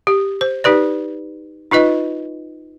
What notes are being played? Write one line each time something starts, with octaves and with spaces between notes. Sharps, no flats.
G4
C5
D#4 G4 B4 D5
D#4 F4 B4 D#5